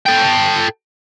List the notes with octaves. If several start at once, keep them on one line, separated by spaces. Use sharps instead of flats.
A4 G5